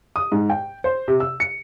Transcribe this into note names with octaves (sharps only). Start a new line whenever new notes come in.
D#6
G#2
G5
C5
C3
E6
C#7